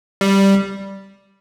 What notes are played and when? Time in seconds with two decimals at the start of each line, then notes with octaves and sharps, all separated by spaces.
0.21 G3